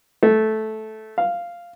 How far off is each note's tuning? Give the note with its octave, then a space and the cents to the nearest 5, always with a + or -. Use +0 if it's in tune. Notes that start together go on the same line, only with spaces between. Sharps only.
A3 -10
F5 -5